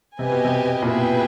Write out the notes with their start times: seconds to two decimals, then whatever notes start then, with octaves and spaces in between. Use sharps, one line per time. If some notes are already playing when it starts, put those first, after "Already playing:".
0.19 C3 G4 B4 D#5 G#5
0.32 B2
0.45 C3
0.82 A#2
0.87 B2 E4 G#4 B4 E5 G5